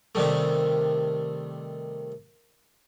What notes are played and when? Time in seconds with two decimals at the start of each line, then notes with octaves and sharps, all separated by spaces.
0.15 C3 D#3 G3 A3